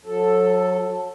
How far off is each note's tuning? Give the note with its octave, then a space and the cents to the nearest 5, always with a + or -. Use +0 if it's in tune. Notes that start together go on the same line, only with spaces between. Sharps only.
F#3 -30 A4 +0